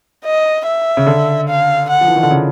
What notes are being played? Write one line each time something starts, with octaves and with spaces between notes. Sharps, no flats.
D#5
E5
C#3
D3
F5
F#5
F3
E3
D#3
D3
C#3